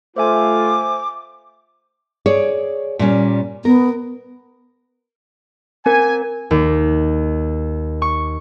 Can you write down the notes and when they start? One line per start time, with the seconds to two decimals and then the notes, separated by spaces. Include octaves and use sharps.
0.16 A3 F4 C5 E5 G#5 D6
2.26 G#4 C#5 D5
2.99 A#2 G3 C#4
3.65 B3 A#4
5.86 C4 A#4 G#5
6.51 D#2
8.02 C#6